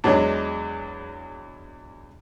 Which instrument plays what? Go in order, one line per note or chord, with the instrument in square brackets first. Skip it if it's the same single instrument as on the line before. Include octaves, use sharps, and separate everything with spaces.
[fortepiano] E2 F#3 G#3 D4